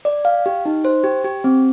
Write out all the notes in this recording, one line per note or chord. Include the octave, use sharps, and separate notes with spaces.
D5
F5
G4
D#4
C5
G4
G4
C4